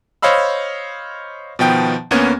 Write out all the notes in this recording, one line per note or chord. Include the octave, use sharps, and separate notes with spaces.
C5 C#5 D#5 F5 B5 E6
B2 D#3 F3 B3 G5
D2 A#3 B3 C#4 G#6